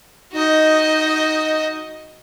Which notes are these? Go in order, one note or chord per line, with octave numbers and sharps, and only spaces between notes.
D#4 F#4 D#5